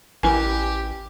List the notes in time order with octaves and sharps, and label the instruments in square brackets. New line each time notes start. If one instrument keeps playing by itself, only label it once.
[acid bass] A1 [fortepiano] E3 A#4 B4 [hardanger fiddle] G4 [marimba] G#5